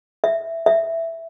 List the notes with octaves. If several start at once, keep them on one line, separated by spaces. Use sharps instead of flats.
E5
E5